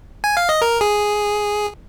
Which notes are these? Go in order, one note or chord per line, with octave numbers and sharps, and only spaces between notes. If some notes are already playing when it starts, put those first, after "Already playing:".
G#5
F5
D#5
A#4
G#4